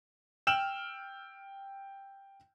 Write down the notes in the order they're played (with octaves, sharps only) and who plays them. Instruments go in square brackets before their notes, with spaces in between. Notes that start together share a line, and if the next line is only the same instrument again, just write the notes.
[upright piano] G5 E6 F6 E7 F#7